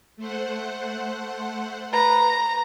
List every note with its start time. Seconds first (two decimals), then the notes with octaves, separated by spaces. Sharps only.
0.17 A3 C5 F#5
1.93 B4 A#5